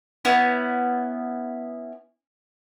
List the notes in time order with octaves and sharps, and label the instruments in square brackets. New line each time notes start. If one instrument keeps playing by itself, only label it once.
[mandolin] B3 C#4 E4